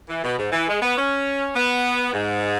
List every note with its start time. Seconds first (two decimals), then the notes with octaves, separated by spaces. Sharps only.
0.09 E3
0.24 B2
0.38 G#2
0.52 E3
0.68 G#3
0.82 B3
0.97 C#4
1.56 B3
2.14 G#2